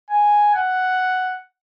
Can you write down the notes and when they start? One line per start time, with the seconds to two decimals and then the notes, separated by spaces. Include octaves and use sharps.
0.10 G#5
0.55 F#5